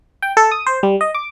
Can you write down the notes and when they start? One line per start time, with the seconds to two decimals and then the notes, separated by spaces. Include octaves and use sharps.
0.22 G5
0.37 A4
0.51 D#6
0.66 C5
0.83 G3
1.01 D#5
1.15 D6